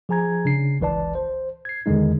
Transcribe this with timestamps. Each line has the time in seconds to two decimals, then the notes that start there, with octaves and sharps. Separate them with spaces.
0.09 F3 G#4 G#5 A#5 G#6
0.45 C#3 D4 C7
0.80 G1 C#2 E3 B4 D5 A5
1.15 C5
1.65 G#6 C7
1.86 E2 D3 D#3 G#3 D#4